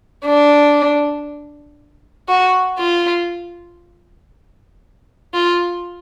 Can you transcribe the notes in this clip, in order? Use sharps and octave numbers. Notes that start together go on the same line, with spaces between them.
D4
F#4
F4
F4